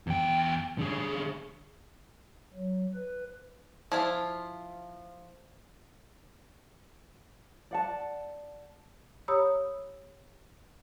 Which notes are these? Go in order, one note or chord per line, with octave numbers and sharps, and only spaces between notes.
E2 G5
D3 G#4
F#3
B4
F3 E4 F4
D5 F#5 A5
G4 C#5 A#5 B5 D#6 E6